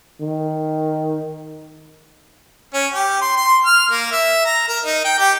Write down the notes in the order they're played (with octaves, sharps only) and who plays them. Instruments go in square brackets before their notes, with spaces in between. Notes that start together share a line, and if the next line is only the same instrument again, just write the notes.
[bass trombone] D#3
[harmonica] C#4
G4
C6
C6
F6
A#3
E5
A#5
A#4
D#4
G5
G4